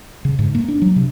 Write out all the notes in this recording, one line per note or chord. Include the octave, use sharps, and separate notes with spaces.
C#3
G#2
A#3
D4
F#3
C3